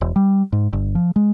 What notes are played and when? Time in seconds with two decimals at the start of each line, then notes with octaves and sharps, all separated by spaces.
0.01 E1
0.16 G3
0.52 G#2
0.73 G1
0.95 F3
1.16 G#3